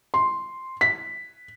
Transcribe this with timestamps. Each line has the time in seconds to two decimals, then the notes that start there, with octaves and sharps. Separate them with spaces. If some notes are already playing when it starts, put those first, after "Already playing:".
0.14 C6
0.81 B6